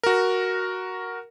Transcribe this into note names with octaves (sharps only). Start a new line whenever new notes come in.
F#4 A#4